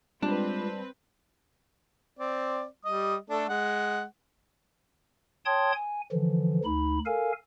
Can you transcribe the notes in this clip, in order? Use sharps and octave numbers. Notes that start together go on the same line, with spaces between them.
G3 G#3 C4 D4 F4 B4 D5
C4 D5
G3 D#5 D#6
A3 D4 A4
G#3 F#5
C#5 G5 A5 C6 D#6 G#6
G#5
D3 E3 F3
D2 D#4 B5
A4 A#4 F5 G#5